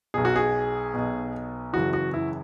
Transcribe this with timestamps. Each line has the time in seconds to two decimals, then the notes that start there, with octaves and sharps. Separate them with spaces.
0.14 B1 B2 G#4
0.25 F#4
0.36 G#4
0.94 B1 B2
1.73 F#1 F#2 C#3 E3 F#4
1.93 F#4
2.14 E4